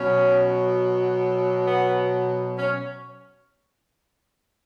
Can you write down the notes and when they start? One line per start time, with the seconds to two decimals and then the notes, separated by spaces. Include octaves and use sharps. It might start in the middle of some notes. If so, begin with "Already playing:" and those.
Already playing: B2 F#3 C#4
1.67 B3
2.57 C#4